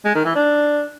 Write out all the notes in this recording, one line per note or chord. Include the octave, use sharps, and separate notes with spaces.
G#3
D#3
E3
D4